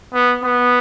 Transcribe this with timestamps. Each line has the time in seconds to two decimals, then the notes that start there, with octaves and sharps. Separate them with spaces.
0.13 B3
0.43 B3